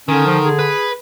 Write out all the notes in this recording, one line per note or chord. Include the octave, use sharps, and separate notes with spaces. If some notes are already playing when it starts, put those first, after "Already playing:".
D3 D#3 C#4
F3
G#4
B4